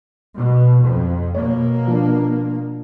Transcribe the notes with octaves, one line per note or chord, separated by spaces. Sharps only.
B2
F2
B2 A#3 C#5
F3 D4